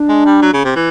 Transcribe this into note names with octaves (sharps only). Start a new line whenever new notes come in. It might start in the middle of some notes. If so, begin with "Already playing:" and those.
Already playing: D4
G#3
G3
F#3
C#3
C3
E3